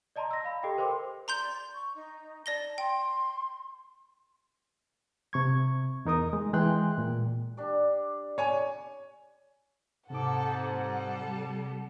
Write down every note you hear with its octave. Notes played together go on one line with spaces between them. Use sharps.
D5 D#5 A5 A#5 C6
E6 A#6
F5 B5
G4 A4 D#5 G5
A#4 C5 G5 C6 D6
D5 A#5 C6 G6
C#6
D#4
D5 A5 A#6 G7
G5 C6
C3 C#6 G#6
E2 D#4 A#4 D#6
G#3
E3 G#3 G5 C6 F#6
A#2
D4 G4 D5
C#5 G#5
G#2 C3 A4 F#5 D6
G3 A4